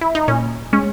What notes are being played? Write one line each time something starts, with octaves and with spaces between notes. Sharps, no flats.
E4
D#4
A#2 C#4
G#3 C#4